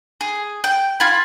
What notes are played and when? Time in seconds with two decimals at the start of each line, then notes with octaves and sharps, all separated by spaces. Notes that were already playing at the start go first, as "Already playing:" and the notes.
0.21 G#4
0.64 G5
1.00 F4 G#5 B5